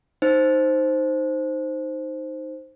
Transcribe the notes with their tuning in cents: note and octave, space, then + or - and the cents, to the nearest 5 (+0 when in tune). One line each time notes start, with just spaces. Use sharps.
D#4 +0 C5 +0